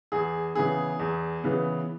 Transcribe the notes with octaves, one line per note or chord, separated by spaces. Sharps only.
E2 G#4
C#3 E3 B3 G#4
E2
C#3 E3 B3